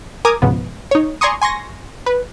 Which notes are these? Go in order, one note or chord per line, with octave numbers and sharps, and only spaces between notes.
A#4 G#5 A#5 D6 D#6
C#2 G#2 B2 F3 B3
D#4 C#5
D5 G#5 A#5 C6 C#6 D#6
G#5 C6 C#6 A#6
B4